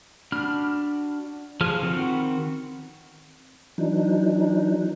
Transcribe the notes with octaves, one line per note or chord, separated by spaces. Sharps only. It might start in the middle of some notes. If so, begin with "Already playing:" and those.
D4 F#4 B5 F6
F3 G#4 A4 F6
D#3 C4 F#4 F#5 B5
E3 F#3 D4 D#4